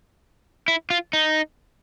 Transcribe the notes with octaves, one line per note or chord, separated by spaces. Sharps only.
E4
F4
D#4